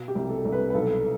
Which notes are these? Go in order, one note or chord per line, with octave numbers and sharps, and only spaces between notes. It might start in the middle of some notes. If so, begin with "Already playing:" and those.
Already playing: B2
G4
C2
A4
C2
B4
B4
B1 A4